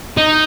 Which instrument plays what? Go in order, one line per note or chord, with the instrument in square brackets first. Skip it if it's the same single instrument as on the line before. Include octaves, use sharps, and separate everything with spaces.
[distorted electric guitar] D#4